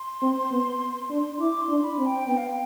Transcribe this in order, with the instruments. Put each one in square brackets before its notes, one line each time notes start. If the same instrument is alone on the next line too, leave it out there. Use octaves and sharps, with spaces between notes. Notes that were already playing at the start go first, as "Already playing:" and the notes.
Already playing: [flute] C6
[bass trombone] C4
B3
D4
[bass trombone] E4 [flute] D6
[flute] C6
[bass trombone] D4
[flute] B5
[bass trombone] C4
[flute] G5
[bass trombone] B3 [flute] G5
[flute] F5
G5